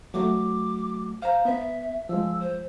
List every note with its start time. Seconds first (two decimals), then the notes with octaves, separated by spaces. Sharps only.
0.14 F#3 A3 F#4 D6
1.22 C5 F5 A#5
1.45 B3 E5
2.09 F3 G#3 E6
2.40 C5